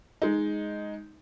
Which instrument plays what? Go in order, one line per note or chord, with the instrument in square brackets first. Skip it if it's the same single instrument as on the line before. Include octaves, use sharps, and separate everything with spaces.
[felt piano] G#3 D#4